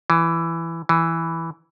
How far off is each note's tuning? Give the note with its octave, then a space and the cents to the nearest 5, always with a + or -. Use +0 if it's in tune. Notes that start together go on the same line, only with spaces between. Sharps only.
E3 +10
E3 +0